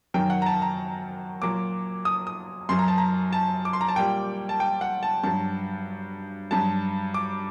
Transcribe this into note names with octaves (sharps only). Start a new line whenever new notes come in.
F#2 D#3 F#3 G5
F#5
A#5
A5
A#5
A#2 F#3 D6
D#6
D#6
F#2 F#3 C6
A#5
A5
A#5
A5
D6
C6
A#5
A5
A#2 G3 G5
A5
G5
F#5
A5
G2 F#3 A5
G2 F#3 A5
D6